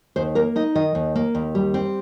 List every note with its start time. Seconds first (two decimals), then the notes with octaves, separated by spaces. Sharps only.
0.16 D#2 C5
0.35 A#3 A#4
0.56 D#4 D#5
0.75 D#3 D#5
0.95 D#2
1.16 A#3
1.35 D#2
1.55 G3
1.74 C4